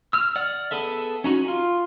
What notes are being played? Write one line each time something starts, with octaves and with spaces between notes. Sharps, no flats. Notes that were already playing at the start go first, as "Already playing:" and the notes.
E6 F6
D5 F#5 F6
B3 G#4 A4 E5
C#4 D#4 F#4
F4